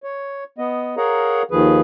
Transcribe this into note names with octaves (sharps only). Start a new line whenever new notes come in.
C#5
B3 D#5
G#4 A#4 C#5 F5 F#5 A#5
D#2 D#3 F3 G#4 B4